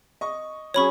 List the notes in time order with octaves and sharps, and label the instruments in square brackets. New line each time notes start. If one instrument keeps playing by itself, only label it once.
[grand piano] D#5 C#6
[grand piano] F#3 C#4 G#4 [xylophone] C#5 B5 C#6